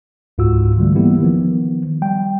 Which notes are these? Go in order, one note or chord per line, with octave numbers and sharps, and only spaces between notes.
C#2 G#2 F4 F#4 E6
D3 E3 G3 A3
E3 G3 A#3 B3 E4 G4
D#3 F3 B3
G3 G5